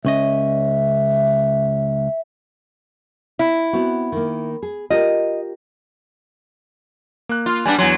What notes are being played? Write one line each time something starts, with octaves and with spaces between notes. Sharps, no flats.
C#2 C#4 D#5 E5
E4
B3 C4 F#4
D#3 A#3
G#4
F4 G4 A#4 D#5
A#3 F#6
F4
G3 B3 D4 G#5
E2 F#3 G#5 C6